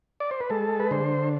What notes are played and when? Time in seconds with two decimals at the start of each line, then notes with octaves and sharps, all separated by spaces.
0.20 D5
0.31 C5
0.41 B4
0.50 G#3 A4
0.80 B4
0.91 D3 C5